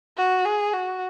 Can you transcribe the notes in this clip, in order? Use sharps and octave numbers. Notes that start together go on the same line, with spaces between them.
F#4
G#4
F#4